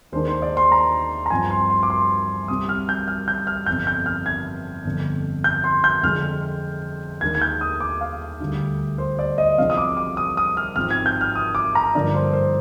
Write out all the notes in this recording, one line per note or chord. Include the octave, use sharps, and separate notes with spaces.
D#2 D#3 G#3 D4 C5
C5
D5
C6
A#5
A#5
G2 F3 C4 G#5
C6
C6
D6
C6
C2 C3 G3 D#6
F6
G6
F6
G6
F6
G1 F2 C3 G6
G6
F6
G#6
G1 F2 D3
G6
C6
G6
F2 D3 G#3 C4 F6
D#2 D#3 G#3 D4 G#6
G#6
G6
D#6
D6
F5
D2 D3 G3 D4
C5
D5
D#5
C2 C3 F3 G#3 D4 F5
D#6
D6
D6
D#6
D#6
F6
G#1 G#2 F3 C4 F6
G#6
G6
F6
D#6
D6
A#5
G2 D3 F3 A#3 D4 D5
C5
C5